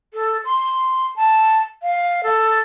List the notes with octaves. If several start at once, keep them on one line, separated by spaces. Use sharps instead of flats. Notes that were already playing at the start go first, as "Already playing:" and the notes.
A4
C6
A5
F5
A4